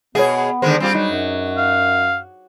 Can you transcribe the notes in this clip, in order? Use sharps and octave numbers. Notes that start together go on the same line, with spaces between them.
B2 B3 G#4 C#5 F#5
D3 D#3 G#3 C5
G3 C4 F4 G4
F#3 D#4
F#2
F5